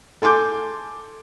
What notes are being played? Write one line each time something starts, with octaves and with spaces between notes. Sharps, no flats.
A4 G#5 C6 D6 G6